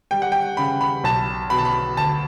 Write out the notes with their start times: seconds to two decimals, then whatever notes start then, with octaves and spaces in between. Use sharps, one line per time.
0.11 G3 G5
0.22 F#5
0.32 G5
0.57 C#3 B5
0.81 B5
1.04 B1 A5
1.50 B2 B5
1.58 A5
1.65 B5
1.97 D2 A5